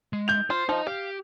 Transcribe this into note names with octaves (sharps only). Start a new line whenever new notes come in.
G#3
G6 F7
F4 C5
F3 D#4 D#5
G4 F5